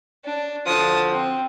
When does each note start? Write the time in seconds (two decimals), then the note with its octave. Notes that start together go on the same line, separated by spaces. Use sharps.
0.25 D4
0.66 D3 F3 F#4 A5 D#6
1.11 C4